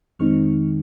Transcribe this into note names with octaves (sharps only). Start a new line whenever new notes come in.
F2 D#3 G#3 C4 D#4 C#6 F6